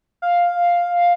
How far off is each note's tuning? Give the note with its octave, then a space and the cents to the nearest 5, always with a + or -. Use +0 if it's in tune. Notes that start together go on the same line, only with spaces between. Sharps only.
F5 +5